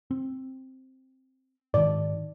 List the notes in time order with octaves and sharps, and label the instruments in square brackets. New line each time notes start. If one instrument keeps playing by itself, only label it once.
[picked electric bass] C4
[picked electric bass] G#2 D#3 [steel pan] D5